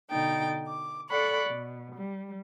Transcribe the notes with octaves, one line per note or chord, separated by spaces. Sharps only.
B2 D3 D#4 G5 A6
D6
A4 D5 F#5 B5 C#6
B2
G3